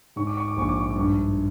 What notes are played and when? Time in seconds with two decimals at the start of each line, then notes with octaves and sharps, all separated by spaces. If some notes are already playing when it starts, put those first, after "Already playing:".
0.16 G#2 C#6
0.27 D6
0.37 C#6
0.48 D6
0.57 A#1 C#6
0.69 D6
0.80 C#6
0.90 D6
0.96 G2 C#6